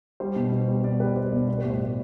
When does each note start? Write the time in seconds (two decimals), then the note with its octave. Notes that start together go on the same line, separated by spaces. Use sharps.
0.20 G3 C5
0.36 B2
0.52 B2
0.68 G3
0.84 B2 D5
1.00 G3 B4
1.16 G3 C5
1.32 B2 D5
1.48 G3 C5
1.59 B4
1.64 A2
1.70 C5
1.80 A2 D5